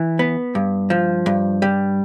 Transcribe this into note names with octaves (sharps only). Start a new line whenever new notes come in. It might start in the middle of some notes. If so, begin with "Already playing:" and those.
Already playing: E3
B3
G2
F3
G2
G3